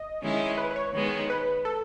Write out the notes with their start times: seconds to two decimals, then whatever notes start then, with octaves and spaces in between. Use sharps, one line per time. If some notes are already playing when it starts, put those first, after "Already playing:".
Already playing: D#5
0.23 D#3 G#3 C#4 E4
0.58 B4
0.71 B4
0.76 C#5
0.94 D#3 G#3 B3 D#4
1.30 B4
1.65 A4